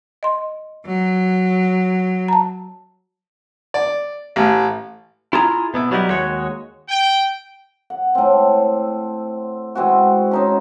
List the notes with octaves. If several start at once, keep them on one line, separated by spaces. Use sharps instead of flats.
D#5 C6
F#3
A5 A#5
D5
A1
E4 F4 G#4 A5 A#5
B2 B3 E4
F#3 G3 B3 D#4 E4
D#2 G#3 F#4 C#5
G5
F#5
A2 C4
E3 G#3 C4 F#4
C#4 D#4 C5